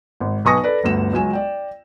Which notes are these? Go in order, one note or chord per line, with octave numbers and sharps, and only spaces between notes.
G#1
B1 B4 G#5 C#6 D#6 A#6
A4 B4 D5
G1 D2 E7
C#2 F#3 G#5 E7
D5 G5